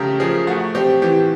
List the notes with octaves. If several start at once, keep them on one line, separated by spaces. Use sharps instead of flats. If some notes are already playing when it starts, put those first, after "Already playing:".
Already playing: C#3 A3 G4 A#4
F3 G#4
A3 F#4
C4 G4
E3 G4